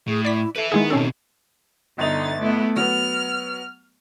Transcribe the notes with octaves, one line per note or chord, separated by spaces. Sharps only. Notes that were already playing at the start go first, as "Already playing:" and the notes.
A2 G#4
E4 D5 B6
A4 B4 E5
D#3 G#3 B3 E4 G#4
B2 C4 C#4 A4
G1 D3 D#4 D#5 A6 F7
A3 B3 E4
F#3 B3 F6